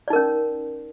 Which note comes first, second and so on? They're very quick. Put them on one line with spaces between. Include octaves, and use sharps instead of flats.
D5 D#4 A#4 C#4